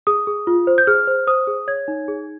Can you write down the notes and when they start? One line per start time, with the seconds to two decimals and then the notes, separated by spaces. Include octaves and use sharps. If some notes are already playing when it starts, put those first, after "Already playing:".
0.07 G#4 D#6
0.27 G#4
0.47 F4
0.67 C5
0.78 G6
0.87 G#4 F6
1.07 C5
1.27 C5 D#6
1.47 G#4
1.68 C#5 G#6
1.88 D#4
2.08 G#4